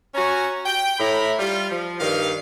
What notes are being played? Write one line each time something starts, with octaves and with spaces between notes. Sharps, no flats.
C#4 F#4 G#5 A#5
G5
A2 E4 A#5 B5
G3 F4
F3
G2 D#3 A#3 F5